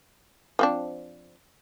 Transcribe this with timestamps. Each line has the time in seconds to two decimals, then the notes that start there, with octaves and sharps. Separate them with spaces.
0.59 F3 C4 D4